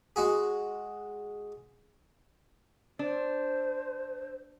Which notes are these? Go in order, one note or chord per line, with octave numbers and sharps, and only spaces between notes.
G#3 F#4 G#4
D4 C5